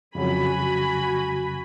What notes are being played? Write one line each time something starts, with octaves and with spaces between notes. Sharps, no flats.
F2 C#3 F#3 F#4 G#5 B5